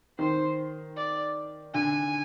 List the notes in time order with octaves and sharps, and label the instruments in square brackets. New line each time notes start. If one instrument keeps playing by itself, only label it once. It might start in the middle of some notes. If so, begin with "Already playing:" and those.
[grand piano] D#3 [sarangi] C5
[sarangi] D5
[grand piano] D3 [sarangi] G#5